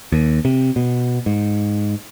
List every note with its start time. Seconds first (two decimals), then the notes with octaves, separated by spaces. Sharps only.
0.12 D#2
0.45 C3
0.76 B2
1.26 G#2